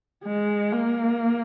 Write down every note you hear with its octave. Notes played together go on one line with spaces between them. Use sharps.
G#3
A#3